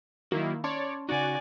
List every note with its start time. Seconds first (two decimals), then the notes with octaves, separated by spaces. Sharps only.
0.32 D#3 F#3 A#3 E4 F#4
0.64 C#4 C#5 D5 A5 C6
1.09 C#3 C#4 D#4 F#4 D5 G#5